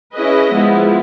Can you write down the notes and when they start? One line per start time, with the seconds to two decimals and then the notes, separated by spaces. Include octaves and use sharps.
0.14 C#4 E4 G#4 B4 D#5
0.53 F3 G#3 B3 E4